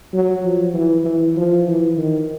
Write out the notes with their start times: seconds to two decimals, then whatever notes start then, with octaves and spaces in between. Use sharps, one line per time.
0.13 F#3
0.44 F3
0.74 E3
1.05 E3
1.37 F3
1.67 E3
1.97 D#3